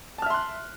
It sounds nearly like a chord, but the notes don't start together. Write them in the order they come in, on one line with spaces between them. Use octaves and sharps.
A5 F6 E5 C6 F#6